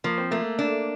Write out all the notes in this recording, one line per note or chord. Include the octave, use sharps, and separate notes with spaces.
F3 A#3
C4
A3 A#3
D4